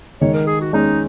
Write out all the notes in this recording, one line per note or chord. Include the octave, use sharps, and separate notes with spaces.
D#3 G#3 C#5
A#4
G#4
F#4
G#3 C#4 D#4